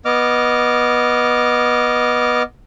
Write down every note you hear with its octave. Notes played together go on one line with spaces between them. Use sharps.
B3 D#5 D6 F6